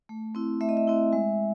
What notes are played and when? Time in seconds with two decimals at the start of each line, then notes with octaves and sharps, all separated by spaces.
0.09 A3
0.35 C4 E4
0.61 A3 E5
0.69 D#5
0.77 E5
0.87 C4 E4
1.13 G#3